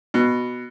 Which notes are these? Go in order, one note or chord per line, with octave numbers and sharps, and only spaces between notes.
B2